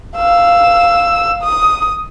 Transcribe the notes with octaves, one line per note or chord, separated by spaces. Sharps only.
F5 E6
D#6